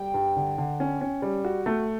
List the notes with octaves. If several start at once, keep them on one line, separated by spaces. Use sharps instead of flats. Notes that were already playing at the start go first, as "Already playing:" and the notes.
Already playing: G3 G5
G2
D3
D3
C#4
C#4
G3
F#4
A3